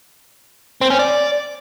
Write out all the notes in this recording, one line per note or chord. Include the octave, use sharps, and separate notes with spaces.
C4
C#4
D5